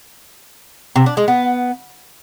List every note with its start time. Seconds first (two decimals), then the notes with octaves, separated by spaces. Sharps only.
0.96 C3
1.06 D4
1.17 G#3
1.28 B3